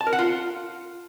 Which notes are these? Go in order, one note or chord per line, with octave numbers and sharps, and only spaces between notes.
A5
A#4
F#5
F4